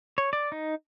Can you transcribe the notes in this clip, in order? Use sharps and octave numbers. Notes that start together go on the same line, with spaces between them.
C#5
D5
D#4